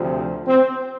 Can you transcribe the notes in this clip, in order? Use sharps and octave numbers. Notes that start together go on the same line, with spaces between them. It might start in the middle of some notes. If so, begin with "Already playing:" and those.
Already playing: D2 C3 F3
C4